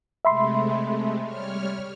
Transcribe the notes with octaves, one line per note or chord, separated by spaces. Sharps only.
C3 G#3 A3 E5 B5 C6
G3 C#5 F6